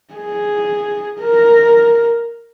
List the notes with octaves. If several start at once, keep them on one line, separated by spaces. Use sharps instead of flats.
G#4
A#4